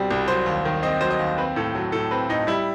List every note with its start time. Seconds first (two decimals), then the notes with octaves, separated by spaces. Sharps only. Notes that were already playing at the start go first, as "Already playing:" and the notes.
Already playing: C2 B2 G3 C4
0.11 C2
0.28 F#3 C5
0.46 D#2
0.65 D#3
0.83 C4 D#5
1.01 F#3 C5
1.10 D#5
1.19 D#2
1.38 C4 B4
1.56 A2 A4
1.75 F#3
1.92 A2 A4
2.11 C4 B4
2.29 A2 D#4
2.47 G3 E4